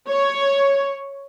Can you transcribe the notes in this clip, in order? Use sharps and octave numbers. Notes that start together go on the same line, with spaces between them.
C#5